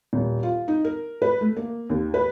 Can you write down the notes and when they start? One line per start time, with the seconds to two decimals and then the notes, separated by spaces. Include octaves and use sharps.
0.13 D#1
0.43 F4
0.68 D#4
0.84 A#4
1.22 B4
1.41 A3
1.56 A#3
1.90 D#2
2.14 B4